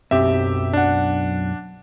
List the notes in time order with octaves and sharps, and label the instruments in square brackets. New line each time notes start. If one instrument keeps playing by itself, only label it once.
[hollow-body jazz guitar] B1 F#2 C4 [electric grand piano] G4 E5
[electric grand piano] D4 F#5